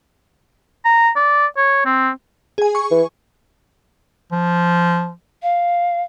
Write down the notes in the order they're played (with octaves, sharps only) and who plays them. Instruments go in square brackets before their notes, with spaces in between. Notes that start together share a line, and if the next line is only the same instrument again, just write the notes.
[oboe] A#5
D5
C#5
C4
[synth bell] G#4 G#5
C#6
[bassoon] E3
[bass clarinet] F3
[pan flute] F5